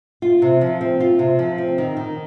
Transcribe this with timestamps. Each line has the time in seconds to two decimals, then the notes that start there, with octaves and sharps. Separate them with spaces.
0.22 F4
0.42 C3
0.61 F3
0.81 C4
1.00 F4
1.19 C3
1.39 F3
1.58 C4
1.78 D#3
1.97 D#3